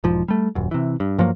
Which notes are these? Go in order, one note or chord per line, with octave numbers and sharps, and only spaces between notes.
E1 G#2 F3
G3 A3
D#1 F#2
C3 E3
G2
G2 F3 F#3 A#3